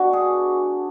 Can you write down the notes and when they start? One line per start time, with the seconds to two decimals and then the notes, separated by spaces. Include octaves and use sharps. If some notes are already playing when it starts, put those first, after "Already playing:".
Already playing: B2 D4 F#4
0.13 G#4